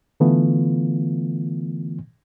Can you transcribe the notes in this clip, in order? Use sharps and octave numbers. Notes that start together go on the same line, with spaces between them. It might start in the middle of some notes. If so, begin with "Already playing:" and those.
D3 E3 A3 B3 F4